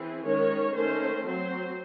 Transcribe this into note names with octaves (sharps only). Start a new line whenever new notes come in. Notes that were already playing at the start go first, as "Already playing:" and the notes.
Already playing: E3 C4 G#4
D#3 G#3 C#4 C#5
D#3 A3 C#4 C5
F#3 C4 C5